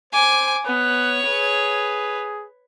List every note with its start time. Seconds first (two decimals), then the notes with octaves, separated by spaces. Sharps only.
0.13 C5 G#5 D6
0.66 B3 C#5 F#6
1.26 G#4 B4